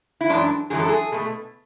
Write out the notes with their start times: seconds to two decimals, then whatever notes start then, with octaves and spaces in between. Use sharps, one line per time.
0.21 E4
0.29 F#2 E3 G#3 D4
0.70 F#2 E3 G#3 G#4
0.80 A4
0.89 G#4
1.12 B2 A3